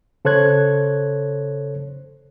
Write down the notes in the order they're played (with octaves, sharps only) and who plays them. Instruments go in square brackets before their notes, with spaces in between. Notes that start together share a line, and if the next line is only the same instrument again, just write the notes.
[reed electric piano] C#3 A4 C5 C#5 F#6 G#6